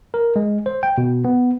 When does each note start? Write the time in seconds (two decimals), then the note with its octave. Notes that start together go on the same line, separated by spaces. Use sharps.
0.14 A#4
0.36 G#3
0.66 C5
0.83 G5
0.98 B2
1.25 B3